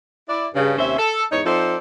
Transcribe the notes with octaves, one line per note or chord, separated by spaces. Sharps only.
E4 D5
G2 C#3
D#2 C3 C#4 C5 E5
A4
E2 G#2 D#4 C#5
F3 C4 D#4 A4 C5 D5